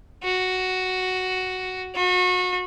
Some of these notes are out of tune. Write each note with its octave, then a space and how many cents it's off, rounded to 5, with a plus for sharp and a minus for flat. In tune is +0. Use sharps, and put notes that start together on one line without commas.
F#4 +5
F#4 -30